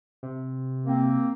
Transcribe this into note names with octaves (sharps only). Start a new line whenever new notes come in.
C3
A#3 C4